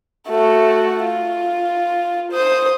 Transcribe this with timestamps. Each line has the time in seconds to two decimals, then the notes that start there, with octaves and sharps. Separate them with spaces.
0.29 A3 F#4
1.04 F4
2.32 C5 D#6